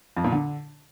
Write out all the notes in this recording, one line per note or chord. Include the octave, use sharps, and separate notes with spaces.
F2
A#2
D3